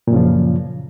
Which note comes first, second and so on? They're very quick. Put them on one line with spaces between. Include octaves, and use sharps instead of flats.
A#2 F#2 C#3 F3